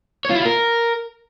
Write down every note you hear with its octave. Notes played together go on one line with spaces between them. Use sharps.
C#5
F4
E4
F4
A#4